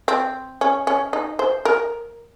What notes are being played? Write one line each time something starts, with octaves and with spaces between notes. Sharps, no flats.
C4
C#4
C#4
D#4
C5
A#4